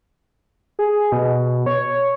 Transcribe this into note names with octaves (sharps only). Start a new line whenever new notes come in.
G#4
B2
C#5